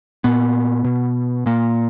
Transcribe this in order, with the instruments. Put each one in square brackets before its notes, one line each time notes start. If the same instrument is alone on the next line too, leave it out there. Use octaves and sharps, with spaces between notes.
[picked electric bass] A#2 B3
B2
A#2 A#3